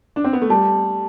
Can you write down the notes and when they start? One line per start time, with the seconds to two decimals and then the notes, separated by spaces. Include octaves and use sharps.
0.16 D4
0.24 C4
0.33 B3
0.42 A3
0.50 G3 A5